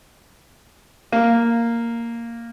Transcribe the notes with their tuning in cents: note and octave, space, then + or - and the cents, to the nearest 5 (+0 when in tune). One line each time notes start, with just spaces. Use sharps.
A#3 -5